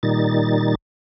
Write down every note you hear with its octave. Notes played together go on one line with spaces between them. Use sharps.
A#2 D#3 G3 D#4 A6